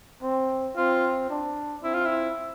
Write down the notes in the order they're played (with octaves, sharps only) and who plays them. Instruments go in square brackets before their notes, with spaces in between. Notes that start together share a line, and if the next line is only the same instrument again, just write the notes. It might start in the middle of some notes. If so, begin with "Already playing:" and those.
[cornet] C4
[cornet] C4 [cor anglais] F4
[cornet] D4
[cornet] C4 [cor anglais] E4
[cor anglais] F4
E4